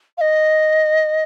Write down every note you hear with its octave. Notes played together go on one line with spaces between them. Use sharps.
F5
D#5